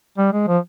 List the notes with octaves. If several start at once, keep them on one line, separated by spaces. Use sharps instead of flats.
G3
G#3
F3